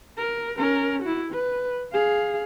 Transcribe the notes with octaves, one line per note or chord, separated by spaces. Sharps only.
A#4
C#4 A#4
E4 F#4
B4
G#4 F5